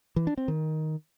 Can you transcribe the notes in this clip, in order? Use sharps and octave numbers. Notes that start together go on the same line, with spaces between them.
E3
D4
C4
D#3